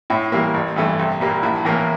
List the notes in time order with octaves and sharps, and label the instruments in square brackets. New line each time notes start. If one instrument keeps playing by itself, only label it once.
[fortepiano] A2 E4
E3 G3 A#3
A1
G2 E3 A3
C2
A#2 G3 A#3
A#1 E4
A2 E3 A#3